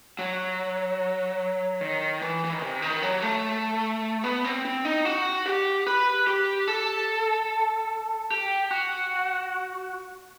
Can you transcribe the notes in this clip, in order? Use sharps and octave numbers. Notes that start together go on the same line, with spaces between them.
F#3
D#3
E3
E3
D#3
C3
D#3
F#3
A3
B3
C4
C4
D#4
F#4
G4
B4
G4
A4
G4
F#4